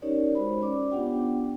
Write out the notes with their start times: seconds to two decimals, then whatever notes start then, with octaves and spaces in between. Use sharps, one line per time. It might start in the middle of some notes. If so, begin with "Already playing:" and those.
0.02 C#4 D#4 G4 A#4 C#5 D5
0.35 G#3 F#4 C5 B5
0.61 C#4 D5 D6
0.91 B3 D4 F4 G4 F#5 G5